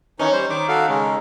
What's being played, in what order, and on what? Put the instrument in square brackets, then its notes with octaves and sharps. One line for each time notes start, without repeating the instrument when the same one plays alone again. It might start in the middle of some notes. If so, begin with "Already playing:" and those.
[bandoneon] D#3 E3 D#4 [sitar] C#4
[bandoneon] G3 C5
[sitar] D#3 [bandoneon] D6
[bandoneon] F#4 A4 F5
C#3 G#3 C#4